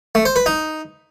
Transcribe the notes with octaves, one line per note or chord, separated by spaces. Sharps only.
A3
C5
B4
D#4